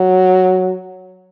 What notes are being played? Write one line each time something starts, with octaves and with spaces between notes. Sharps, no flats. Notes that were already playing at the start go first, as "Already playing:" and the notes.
Already playing: F#3